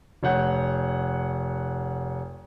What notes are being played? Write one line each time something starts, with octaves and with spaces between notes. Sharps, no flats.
F1 C#5 F#5 G6